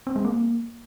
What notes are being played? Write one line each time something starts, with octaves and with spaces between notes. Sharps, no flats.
C4
G#3
A#3